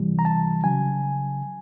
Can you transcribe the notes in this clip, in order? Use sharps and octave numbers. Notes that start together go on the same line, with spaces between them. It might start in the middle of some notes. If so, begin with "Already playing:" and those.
Already playing: C#2 C3 E3 G3
A#5
A5
C#3 F#3 G#5